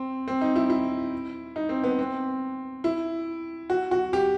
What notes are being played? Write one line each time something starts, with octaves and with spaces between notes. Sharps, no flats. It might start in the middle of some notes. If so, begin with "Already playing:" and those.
Already playing: C4
C4
D#4
E4
E4
D#4
C4
B3
C4
E4
F#4
F#4
G4